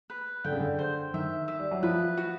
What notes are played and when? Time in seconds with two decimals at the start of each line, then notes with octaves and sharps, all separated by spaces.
0.10 B4
0.44 D3 G5
0.52 C#3
0.60 D3
0.79 C5
1.14 D#3 E5
1.48 E5
1.59 G3
1.71 F#3
1.83 F3 B4
2.17 F#4